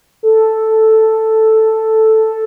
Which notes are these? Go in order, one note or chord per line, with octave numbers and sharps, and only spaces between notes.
A4